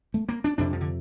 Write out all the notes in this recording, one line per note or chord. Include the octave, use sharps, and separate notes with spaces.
A3
A#3
D4
F2 C3 D4
F3
D3